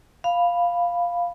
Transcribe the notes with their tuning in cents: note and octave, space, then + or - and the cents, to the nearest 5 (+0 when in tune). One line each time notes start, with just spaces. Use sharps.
F5 +0 B5 +0